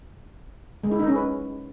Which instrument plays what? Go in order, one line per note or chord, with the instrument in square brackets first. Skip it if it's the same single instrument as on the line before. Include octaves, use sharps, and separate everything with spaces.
[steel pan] G#3
E4
D#4
C#4
B4